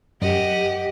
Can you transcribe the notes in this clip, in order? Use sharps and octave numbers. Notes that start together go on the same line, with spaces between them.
F#2 G4 D#5 F#5